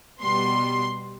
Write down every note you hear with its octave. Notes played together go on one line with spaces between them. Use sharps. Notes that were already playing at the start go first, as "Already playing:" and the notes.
B2 G3 B3 C6